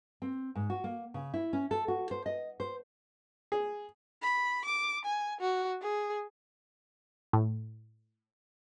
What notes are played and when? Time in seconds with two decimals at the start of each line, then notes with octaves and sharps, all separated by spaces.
0.22 C4
0.55 G#2
0.70 F#4
0.84 A#3
1.14 C#3
1.34 E4
1.53 C#4
1.71 A4
1.88 F#4
2.11 C5
2.26 D#5
2.60 C5
3.52 G#4
4.22 B5
4.65 D6
5.05 G#5
5.41 F#4
5.81 G#4
7.33 A2